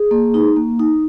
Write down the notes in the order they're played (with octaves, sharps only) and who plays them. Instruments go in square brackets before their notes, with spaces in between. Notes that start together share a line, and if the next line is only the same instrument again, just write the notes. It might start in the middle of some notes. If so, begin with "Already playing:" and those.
Already playing: [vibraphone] G#4
A#3
D#4
A#3
D#4